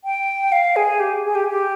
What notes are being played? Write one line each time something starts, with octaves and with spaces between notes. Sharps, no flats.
G5
F5
G#4
G4
G#4
G4
G4